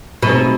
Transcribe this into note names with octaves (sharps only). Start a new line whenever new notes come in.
B2 F#3 A3 C4 D#4 G#4